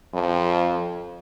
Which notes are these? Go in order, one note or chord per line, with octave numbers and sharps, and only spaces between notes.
F2